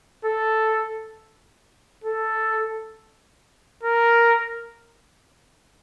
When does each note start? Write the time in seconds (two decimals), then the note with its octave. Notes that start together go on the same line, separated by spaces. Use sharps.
0.25 A4
2.04 A4
3.84 A#4